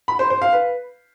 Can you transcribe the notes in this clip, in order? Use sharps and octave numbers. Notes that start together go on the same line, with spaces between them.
B5
C5
C5
F5
B4